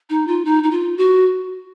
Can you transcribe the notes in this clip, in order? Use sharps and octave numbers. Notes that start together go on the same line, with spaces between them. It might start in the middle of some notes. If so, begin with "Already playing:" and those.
D#4
F4
D#4
D#4
F4
F#4